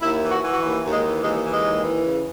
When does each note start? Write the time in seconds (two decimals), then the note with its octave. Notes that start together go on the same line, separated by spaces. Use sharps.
0.01 D#2 E4
0.21 E3
0.31 F#4
0.41 E3
0.53 F#4
0.62 D#2 E4
0.83 D#2
0.93 G#3
1.03 E3
1.23 D#2 G#3
1.43 E3
1.53 G#3
1.64 D#2
1.84 E3
2.04 C#3